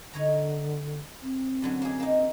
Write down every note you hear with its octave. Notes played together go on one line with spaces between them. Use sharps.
D3 D#4 C#5 A#5
C4
F#2 D3 F#3
A#3 G#4
A#3 D#4